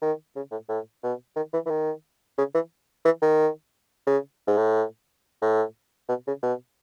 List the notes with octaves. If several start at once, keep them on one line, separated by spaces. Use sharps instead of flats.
D#3
C#3
A2
A2
B2
D#3
E3
E3
D#3
C#3
E3
E3
D#3
C#3
G#2
A2
A2
B2
C#3
B2